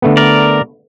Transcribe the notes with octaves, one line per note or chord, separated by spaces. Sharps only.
D3 A3 B3
A#4 D5